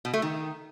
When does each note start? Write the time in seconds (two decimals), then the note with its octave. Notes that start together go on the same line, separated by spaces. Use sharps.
0.05 B2
0.14 A3
0.22 D#3